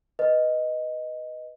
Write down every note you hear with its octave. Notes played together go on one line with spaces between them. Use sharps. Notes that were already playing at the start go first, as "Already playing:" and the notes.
B4 D#5